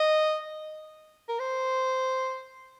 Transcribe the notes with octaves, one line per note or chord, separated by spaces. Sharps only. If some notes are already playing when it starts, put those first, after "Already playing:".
Already playing: D#5
A#4
C5